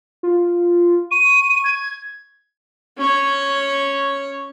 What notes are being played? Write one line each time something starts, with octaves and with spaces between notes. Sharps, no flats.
F4
C#6 D#7
G#6
C#4 C#5